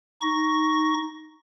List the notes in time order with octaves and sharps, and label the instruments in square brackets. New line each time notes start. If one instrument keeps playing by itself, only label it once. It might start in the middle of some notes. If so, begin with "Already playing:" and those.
[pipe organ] D#4 C#6 A#6